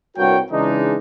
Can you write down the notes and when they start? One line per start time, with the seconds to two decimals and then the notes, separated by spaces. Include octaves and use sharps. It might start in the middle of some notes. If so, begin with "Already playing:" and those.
0.16 C2 G2 F#4 A#4 C#5 G5
0.51 C#3 E3 G#3 D4 D#4